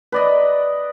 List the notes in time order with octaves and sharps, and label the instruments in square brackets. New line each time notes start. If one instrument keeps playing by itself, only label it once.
[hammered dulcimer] B4 D5 D#5